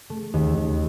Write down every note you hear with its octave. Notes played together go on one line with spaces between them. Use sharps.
A3
D#2
D#2